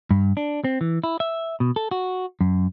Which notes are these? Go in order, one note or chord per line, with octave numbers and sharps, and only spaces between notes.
G2
D4
C4
E3
E4
E5
B2
A4
F#4
F#2